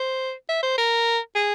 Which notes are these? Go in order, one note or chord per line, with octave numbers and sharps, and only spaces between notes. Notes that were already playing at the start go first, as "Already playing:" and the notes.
Already playing: C5
E5
C5
A#4
G#4